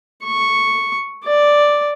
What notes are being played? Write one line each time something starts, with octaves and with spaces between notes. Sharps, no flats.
C#6
D5